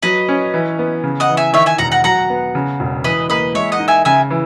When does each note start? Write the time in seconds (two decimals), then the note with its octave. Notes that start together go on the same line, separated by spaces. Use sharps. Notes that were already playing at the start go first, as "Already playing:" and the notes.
0.03 F#3 B4 D#5
0.29 C#4
0.54 E3
0.79 B3
1.04 C#3
1.20 D#5 F#5
1.29 E3
1.37 E5 G#5
1.53 D#3 C#5 E5
1.66 E5 G#5
1.78 E1 F#5 A#5
1.91 F#5 A#5
2.04 F#3 F#5 A#5
2.30 B3
2.55 C#3
2.80 E1
3.04 E3 B4 D#5
3.29 A#3 B4 D#5
3.55 G#3 C#5 E5
3.72 D#5 F#5
3.79 D#4
3.88 E5 G#5
4.05 C#3 E5 G#5
4.30 E3